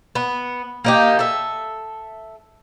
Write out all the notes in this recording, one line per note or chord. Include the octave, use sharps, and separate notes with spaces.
B3
A#3 D#4 G4
A4 E5